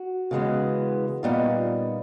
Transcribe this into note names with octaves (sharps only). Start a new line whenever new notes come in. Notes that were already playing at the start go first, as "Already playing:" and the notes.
Already playing: F#4
C#3 E3 G#3 B3
A#2 G3 B3 D#4 F4